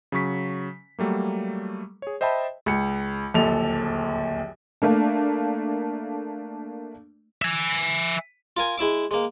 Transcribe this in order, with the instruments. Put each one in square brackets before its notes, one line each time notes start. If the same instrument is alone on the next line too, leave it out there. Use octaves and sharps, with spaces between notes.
[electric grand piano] C#3 F#3 C#6 B6
F#3 G3 A3 A#3
G#4 C#5
C5 D#5 E5 G5 A5 B5
[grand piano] C#2 C#7
D1 A#1 D#2 A4 F7
[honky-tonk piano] A3 A#3 D4
[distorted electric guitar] E5 G#5
[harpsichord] F4 A#4 G#5
G#3 E4 E5 D6
G#3 A#3